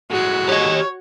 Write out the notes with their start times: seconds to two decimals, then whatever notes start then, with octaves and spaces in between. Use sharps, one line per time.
0.11 A2 G#3 F#4
0.49 G4 C#5 D#5